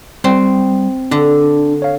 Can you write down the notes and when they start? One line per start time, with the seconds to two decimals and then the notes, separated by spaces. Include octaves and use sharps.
0.24 G3 C4
1.11 D3 D4
1.82 C#5 F5